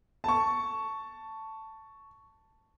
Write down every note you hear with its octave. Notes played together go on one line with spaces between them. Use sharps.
A5 C#6